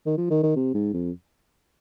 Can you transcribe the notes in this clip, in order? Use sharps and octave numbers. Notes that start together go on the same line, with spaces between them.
D#3
F3
D#3
D#3
C3
G#2
F2